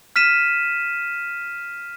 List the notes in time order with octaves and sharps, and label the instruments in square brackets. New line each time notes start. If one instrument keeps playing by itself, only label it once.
[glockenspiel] F6 B6 D#7 E7